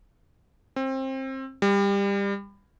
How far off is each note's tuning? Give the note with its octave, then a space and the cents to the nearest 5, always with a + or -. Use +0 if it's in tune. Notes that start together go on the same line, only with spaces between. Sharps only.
C4 +25
G3 +25